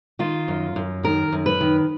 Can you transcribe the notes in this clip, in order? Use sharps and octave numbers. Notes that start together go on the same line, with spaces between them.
D#3 F4
F#2
F#2
D#3 A#4
F#2
B4
D#3